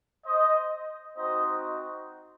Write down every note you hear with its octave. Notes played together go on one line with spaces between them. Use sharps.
C5 D#5
C4 D#4 F#4 C5 D#5